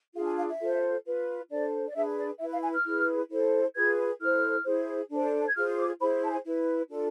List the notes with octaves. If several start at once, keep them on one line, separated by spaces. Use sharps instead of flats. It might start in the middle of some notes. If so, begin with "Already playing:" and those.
D4 F4 G#4 F5
G#5
F5
E5
F4 A4 C5
F4 B4
D4 A4 C5 D5
D5
D4 G#4 B4 E5
D5
E4 B4 E5
F5
G#5
F6
E4 G#4 B4
E4 A4 C5
F4 G#4 B4 G#6
E4 A4 C5 F6
E4 G#4 C5
D4 A4 C5
G#6
F4 G#4 C5 F6
D6
E4 G#4 C5 B5
A5
G#5
E4 B4
D4 F4 A4